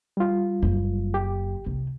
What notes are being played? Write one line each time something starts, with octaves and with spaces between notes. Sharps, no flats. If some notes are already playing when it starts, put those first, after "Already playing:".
G3 F4
F#1 F#2
G4
C2